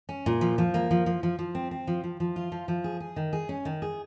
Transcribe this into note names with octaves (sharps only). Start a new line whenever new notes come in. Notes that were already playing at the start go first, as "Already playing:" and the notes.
C#4
A#2
F3
F3
A#3
F3
F3
F3
F3
C4
C4
F3
F3
F3
F4
F3
F3
G#4
G#4
D#3
G#4
C#4
D#3
G#4